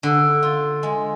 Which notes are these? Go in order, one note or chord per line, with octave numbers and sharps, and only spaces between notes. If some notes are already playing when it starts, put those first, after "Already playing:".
D3
F4
G#3